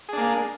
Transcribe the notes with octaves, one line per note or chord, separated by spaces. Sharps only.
A#3 D4 G#4